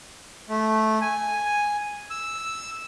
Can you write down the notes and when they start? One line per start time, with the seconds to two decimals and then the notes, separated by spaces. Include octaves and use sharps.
0.49 A3
1.01 G#5
2.10 E6